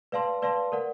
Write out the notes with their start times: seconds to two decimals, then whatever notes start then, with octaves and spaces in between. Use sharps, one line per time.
0.12 B4 D5 F5 A5 C6
0.42 B4 D5 F5 A5 C6
0.72 A#4 D5 F#5